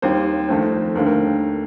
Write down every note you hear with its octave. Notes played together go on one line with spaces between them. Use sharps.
D#2 D#3 G3 C4 C5
F2 D#3 A3 C4
D#2 D3 A3 A#4
A#4